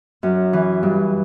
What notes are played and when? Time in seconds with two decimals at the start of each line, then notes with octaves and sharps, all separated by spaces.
0.23 F#2
0.53 E3
0.83 G2